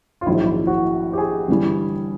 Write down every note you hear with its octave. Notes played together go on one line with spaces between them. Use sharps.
F4
A#1 G#2 D#3 F#3 E4
E4
F#4
G4
G#4
G1 G2 E3 G3